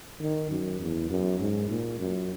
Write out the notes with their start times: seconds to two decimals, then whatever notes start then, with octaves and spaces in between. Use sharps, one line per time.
0.20 D#3
0.50 F#2
0.80 E2
1.09 F#2
1.40 G#2
1.69 A#2
1.99 F#2